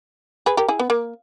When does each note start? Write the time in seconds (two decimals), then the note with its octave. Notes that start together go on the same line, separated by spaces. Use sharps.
0.46 G#4 B4
0.57 G4 A#4
0.68 E4 G#4
0.79 B3
0.90 A#3